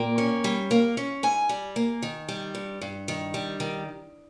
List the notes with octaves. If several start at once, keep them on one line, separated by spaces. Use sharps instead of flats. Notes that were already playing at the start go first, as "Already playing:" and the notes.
Already playing: A#2 A#3 G5
C#4
G3
A#3
C#4
G#2 G#5
G3
A#3
D#3
G3
G2
G2
D#3
G3
D#3